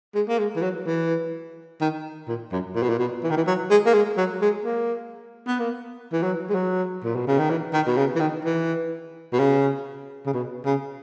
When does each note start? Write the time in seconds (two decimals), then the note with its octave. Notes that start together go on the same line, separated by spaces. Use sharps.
0.15 G#3
0.28 A#3
0.39 G#3
0.56 E3
0.62 F#3
0.86 E3
1.81 D#3
2.28 A#2
2.52 F#2
2.75 A#2
2.83 B2
2.89 A#2
2.99 B2
3.23 E3
3.30 D#3
3.37 E3
3.47 F#3
3.70 G#3
3.86 A#3
3.94 G#3
4.17 F#3
4.41 G#3
4.65 A#3
5.47 B3
5.59 A#3
6.12 E3
6.23 F#3
6.50 G#3
6.55 F#3
7.04 A#2
7.16 B2
7.27 C#3
7.39 D#3
7.50 E3
7.73 D#3
7.87 B2
7.97 C#3
8.16 E3
8.20 D#3
8.45 E3
9.33 B2
9.39 C#3
10.26 C#3
10.33 B2
10.65 C#3